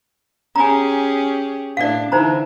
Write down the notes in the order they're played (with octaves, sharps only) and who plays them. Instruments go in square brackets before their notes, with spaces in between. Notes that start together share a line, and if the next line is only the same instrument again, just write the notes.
[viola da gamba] C#4 G4 G#4 [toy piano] G#5 A#5
[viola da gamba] A2 D4 [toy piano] D5 F5
[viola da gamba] D3 E3 [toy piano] D#4 C5 A#5